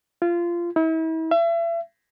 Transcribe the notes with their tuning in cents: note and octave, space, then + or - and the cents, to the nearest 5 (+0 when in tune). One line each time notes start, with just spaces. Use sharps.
F4 -20
E4 -40
E5 +35